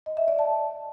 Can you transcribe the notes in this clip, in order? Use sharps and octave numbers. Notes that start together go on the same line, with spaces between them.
D#5
E5
D5
A5